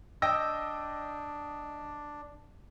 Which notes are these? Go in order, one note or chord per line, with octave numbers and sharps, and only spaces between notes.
D4 D#5 G5 E6 A#6